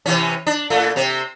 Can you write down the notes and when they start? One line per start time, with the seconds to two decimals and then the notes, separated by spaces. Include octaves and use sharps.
0.06 C3 E3 C#4
0.47 D4
0.70 A2 A3
0.96 C3 C4